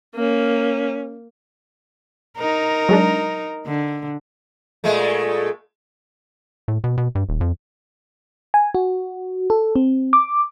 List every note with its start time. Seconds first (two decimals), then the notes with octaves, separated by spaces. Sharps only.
0.16 A#3 C#4
2.37 D#4 A#4
2.89 F#3 G#3 D4
3.67 D3
4.84 A#2 G#3 A3
6.68 A2
6.84 B2
6.98 B2
7.15 G2
7.29 D#1
7.41 F2
8.54 G#5
8.75 F#4
9.50 A4
9.76 C4
10.13 D6